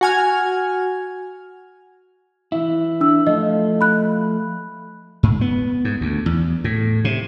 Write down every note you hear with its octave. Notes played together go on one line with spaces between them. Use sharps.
F#4 G#5 F6
E3 E4
D4 E6
F3 A3 D#5
B5 F#6
G#2
B3
G#2
D2
E2
A2
C3